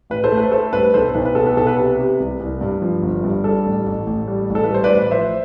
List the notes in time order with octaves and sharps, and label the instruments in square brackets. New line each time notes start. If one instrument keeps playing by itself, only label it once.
[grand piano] A1 B4
A4 C5
A3
B4
A3 A4 C5
G2 B4
B1 A4 C5
B1 B4
B4
B2 A4
B4
B1 A4
B4
C3 B4
C3
C2
C2
G2
F3
G1
G2
G3 A4
A1
A1
A1
G3
A1
A4
B4
G3 C5
B4 D5
A1
B4
F3 C5 E5